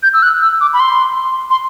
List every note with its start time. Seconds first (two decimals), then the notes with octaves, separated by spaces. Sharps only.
0.03 G6
0.14 E6
0.23 F#6
0.41 E6
0.61 D6
0.73 B5
0.80 C6
1.50 C6